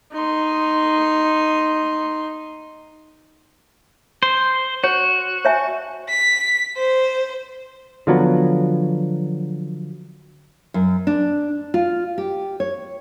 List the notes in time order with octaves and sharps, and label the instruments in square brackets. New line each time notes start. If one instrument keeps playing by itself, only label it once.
[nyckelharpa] D#4 C6
[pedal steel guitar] C5
[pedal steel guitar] F#4 [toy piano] C#5
[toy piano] C#5 E5 G#5
[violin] B6
C5
[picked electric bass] D3 F3 F#3 B3
[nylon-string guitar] F#2
D4
F4
G4
C#5